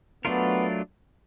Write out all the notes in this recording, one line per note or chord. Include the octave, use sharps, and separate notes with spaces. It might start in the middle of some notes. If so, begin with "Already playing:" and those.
F#3 A3 B3 D4 F4 A#4